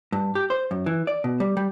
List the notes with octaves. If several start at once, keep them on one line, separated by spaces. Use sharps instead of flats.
G2
G4
C5
F#2
E3
D5
B2
G3
G3